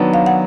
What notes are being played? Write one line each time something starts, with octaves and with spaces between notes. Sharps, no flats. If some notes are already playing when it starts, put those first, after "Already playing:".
Already playing: D#3 F#3 B3 D4
F5
F#5